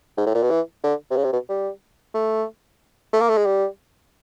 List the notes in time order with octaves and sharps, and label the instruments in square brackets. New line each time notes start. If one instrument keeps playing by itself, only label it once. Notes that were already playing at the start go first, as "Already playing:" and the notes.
[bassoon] G#2
A2
A#2
B2
E3
D3
C3
C#3
C3
B2
G3
A3
A3
A#3
A3
G#3
G3